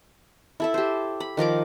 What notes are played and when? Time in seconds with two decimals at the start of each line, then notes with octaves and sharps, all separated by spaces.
0.60 E4 A4 E5
0.74 G4 C5
1.20 B5
1.37 D#3 F3 A#4 D6